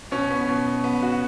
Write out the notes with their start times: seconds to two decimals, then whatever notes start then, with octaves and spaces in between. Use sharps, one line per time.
0.11 B2 C#4
0.31 B3
0.49 B2
0.66 B2
0.84 B3
1.03 F#4